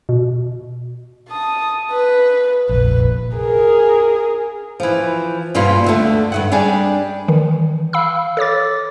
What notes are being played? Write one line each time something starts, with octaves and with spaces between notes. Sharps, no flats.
B2
A5 D#6
B4
F1 A#1 B4
G#4 A#4
E3 F3
G2 B2 G3 A#3 B3 F4
D2 D3 A3
G2 D#3 F#5
G3 D4 G#4 D5 G#5
D#3 E3
F5 B5 E6
A4 C#5 D6 A6